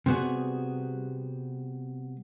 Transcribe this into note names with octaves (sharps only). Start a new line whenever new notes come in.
C3 G3 B3 F#4 G#4